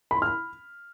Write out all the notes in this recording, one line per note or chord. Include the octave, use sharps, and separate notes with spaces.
B5
C6
F6
B5